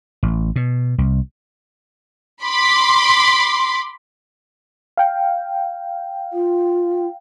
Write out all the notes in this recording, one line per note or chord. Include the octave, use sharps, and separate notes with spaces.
A1
B2
C2
B5 C6 D6
F5 G5
F4